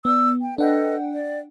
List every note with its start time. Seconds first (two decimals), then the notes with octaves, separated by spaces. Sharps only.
0.05 B3 D5 E6
0.41 G5
0.58 D4 A4 B4 D#5 F#5 G5
1.13 D5